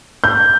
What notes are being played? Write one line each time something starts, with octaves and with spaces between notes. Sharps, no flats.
G6